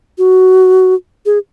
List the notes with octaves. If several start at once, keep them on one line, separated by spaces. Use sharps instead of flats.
F#4
G#4